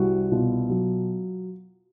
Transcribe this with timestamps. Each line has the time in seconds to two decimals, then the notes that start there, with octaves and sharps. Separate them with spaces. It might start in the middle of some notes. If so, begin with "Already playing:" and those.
Already playing: C2 F#4
0.31 B2 F4
0.69 F#3